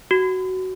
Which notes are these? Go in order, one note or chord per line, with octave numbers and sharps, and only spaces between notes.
F#4